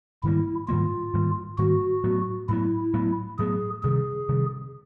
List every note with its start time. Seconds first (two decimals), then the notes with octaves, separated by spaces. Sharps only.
0.23 G#2 D#3 G3 A#3 E4
0.68 G#2 D#3 G3 A#3 F4
1.13 G#2 D#3 G3 A#3
1.58 G#2 D#3 G3 A#3 F#4
2.04 A2 F#3 B3
2.49 A2 F#3 B3 E4
2.94 A2 F#3 B3
3.39 A2 F#3 B3 G#4
3.83 C3 D#3 G3 G#4
4.29 C3 D#3 G3